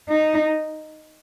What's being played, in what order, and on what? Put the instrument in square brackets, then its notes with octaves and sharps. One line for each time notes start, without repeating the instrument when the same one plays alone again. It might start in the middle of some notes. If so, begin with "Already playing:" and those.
[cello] D#4